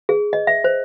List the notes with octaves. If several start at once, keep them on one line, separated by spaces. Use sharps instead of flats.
G#4
D#5
E5
C5